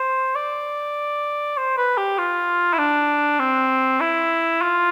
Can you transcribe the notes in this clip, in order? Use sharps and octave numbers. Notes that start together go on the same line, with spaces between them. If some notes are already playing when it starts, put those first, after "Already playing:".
Already playing: C5
D5
C5
B4
G4
F4
E4
D4
C4
E4
F4